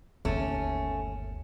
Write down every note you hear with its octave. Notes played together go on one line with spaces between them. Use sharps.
G1 D#2 A3 C#4